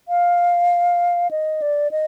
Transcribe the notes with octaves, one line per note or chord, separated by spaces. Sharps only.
F5
D#5
D5
D#5